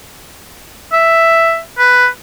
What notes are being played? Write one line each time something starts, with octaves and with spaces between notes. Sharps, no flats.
E5
B4